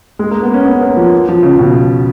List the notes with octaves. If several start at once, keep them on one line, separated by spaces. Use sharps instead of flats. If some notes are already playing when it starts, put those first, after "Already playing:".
G#3
A#3
B3
C#4
B3
A#3
F3
F3
C#3
B2